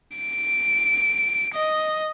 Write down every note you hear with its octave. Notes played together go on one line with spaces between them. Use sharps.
D7
D#5